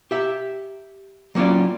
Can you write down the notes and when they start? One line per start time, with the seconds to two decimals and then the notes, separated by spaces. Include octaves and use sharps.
0.11 G4 E5
1.35 F#3 A#3 C#4 F4 D5